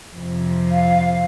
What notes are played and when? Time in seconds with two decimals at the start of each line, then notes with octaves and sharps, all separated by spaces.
0.15 F2 C3
0.71 F5